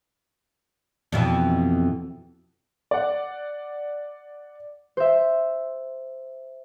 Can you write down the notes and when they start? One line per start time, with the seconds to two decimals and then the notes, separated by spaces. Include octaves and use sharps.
1.12 F2 B2 E3
2.91 D5 F#5
4.97 C5 E5